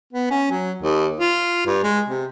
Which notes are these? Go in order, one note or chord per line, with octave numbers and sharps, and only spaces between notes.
B3
C#4
F#3
D#2
F4
G2
G#3
C3